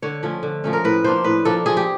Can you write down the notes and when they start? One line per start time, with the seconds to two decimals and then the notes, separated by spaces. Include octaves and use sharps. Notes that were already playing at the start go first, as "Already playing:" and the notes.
0.02 D3 C#5
0.23 F3 A3 C#4
0.43 D3
0.64 F3 A3 C#4
0.73 A#4
0.84 A2 B4
1.04 F3 A#3 D4 C5
1.24 A2 B4
1.45 F3 A#3 D4 A4
1.66 F3 G#4
1.77 G4